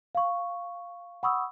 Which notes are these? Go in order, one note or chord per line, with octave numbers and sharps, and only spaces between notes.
F5 C#6
F#5 B5 C#6 D#6 E6